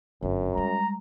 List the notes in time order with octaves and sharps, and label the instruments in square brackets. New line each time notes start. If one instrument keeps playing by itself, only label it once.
[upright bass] G1 [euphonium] F#2
[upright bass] G3 G#3 [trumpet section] A#5